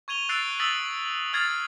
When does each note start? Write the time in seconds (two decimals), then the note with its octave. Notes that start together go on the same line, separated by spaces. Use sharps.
0.08 C#6 G#6 D#7 F7 G7
0.29 E6 F#6 A6 C7 D7
0.59 D#6 E6 A6 B6 F#7 G7
1.33 D#6 F6 G#6 A6 C7